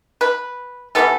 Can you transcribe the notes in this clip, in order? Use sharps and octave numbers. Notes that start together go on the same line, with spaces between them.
B4
C3 E3 B3 A4